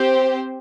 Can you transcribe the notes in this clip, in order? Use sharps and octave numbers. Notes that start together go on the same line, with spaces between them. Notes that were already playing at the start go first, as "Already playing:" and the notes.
Already playing: C4 G4 C5